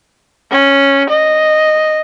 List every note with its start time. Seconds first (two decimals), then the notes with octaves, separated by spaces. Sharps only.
0.51 C#4
1.10 D#5